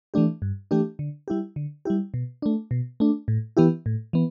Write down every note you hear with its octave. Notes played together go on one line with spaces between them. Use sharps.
E3 A3 D4 G4
G2
E3 A3 D4 G4
D3
G3 E4 G4
D3
G3 E4 G4
B2
A3 D4
B2
A3 D4
A2
E3 B3 E4 G4
A2
E3 B3